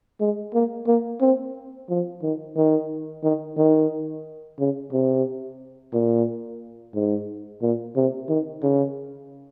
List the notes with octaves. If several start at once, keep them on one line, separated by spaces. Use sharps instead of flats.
G#3
A#3
A#3
C4
F3
D#3
D#3
D#3
D#3
C#3
C3
A#2
G#2
A#2
C3
D#3
C#3